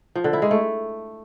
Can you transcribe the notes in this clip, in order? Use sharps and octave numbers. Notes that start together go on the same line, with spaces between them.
F3
D3
E4
G#3
A3